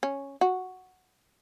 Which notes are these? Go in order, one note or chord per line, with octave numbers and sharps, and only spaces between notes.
C#4
F#4